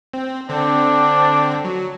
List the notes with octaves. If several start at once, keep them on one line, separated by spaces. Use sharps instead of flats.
C4
D3 C4 D4
F#3